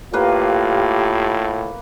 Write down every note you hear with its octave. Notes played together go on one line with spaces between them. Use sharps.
A2 A#3 F4 G4 B4 F5